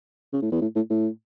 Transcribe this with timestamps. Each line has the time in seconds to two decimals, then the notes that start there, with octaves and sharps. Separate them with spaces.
0.33 C#3
0.42 A2
0.52 E2
0.61 A2
0.76 A2
0.90 A2